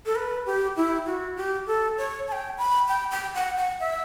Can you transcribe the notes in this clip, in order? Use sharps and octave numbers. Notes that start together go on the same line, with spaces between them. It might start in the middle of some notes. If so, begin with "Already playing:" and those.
A4
B4
G4
E4
F#4
G4
A4
C#5
A5
G5
B5
G5
G5
F#5
F#5
E5